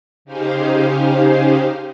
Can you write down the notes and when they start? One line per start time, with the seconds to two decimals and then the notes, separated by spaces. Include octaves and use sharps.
0.25 C#3 D#4 G4 G#4 C5 F5